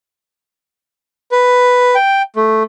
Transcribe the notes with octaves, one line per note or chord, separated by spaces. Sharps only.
B4
G5
A3